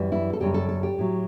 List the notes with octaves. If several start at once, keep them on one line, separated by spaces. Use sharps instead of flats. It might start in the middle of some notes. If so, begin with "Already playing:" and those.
Already playing: F#2 E3 G3
E4
A4
F#2 C#3 G3 G4
A4
A4
G4
A2 F#3